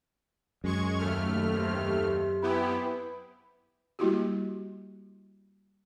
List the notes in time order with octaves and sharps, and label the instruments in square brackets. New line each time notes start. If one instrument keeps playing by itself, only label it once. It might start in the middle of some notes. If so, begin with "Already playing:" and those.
[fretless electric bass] F#2 [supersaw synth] G#3 C#6 G#6
[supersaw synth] D#2 A3 F6
[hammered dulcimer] C3
[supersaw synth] B3 E4 G4 [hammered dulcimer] G#4 B4
[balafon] G3 A#3 E4 F#4 G4